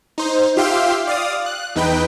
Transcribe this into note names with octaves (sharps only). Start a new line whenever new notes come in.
D#4 C5
F4 G4 E5 F5 G5 C6
D5 F5 D#6
F#6
E2 D#4 B4 G5